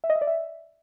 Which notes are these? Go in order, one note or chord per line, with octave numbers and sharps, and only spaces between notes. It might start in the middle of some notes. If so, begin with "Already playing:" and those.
E5
D#5
E5
D5
E5